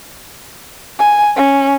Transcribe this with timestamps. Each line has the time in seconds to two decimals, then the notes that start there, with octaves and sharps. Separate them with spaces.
0.99 G#5
1.36 C#4